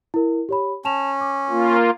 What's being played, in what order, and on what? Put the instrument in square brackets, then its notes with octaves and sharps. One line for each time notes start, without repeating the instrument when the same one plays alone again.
[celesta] E4 A#4
G4 C#5 B5
[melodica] C#4 [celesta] A5 E7 F7
[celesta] D6
[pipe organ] A#3 F4